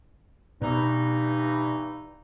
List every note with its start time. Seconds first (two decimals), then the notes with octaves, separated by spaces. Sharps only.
0.62 G2 B2 E3 D#4